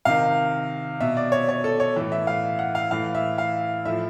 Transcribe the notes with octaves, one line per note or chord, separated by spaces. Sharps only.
C3 D#3 F5
B2 E5
D5
C#5
C#5
A4
C#5
A2 E3
E5
F5
F#5
F5
A2 E3 F5
E5
F5
A2 F3 E5